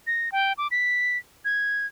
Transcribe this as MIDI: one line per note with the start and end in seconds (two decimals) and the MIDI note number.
0.07 0.32 94
0.32 0.53 79
0.58 0.68 86
0.71 1.18 95
1.45 1.86 92